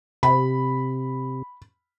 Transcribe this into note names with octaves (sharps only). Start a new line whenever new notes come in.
C3 B5